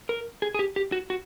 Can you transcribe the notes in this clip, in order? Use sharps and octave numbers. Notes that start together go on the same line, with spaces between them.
A#4
G#4
G#4
G4
G4
F#4
F#4